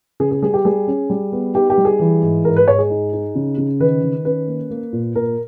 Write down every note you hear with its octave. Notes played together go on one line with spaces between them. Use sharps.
C#3 G#4
G#4
G3 G#4
G4
G3 G#4
C#4
G3
B3
D#4 G4
G4
G3
G#4
E3
G#2
G#2 A#4
B4
G#2 C#5
G#4
D#4
D#4
C#3
C#3
D#3 B4
D#3
C#4 B4
A#3
A#3
A#2
A#2 A#4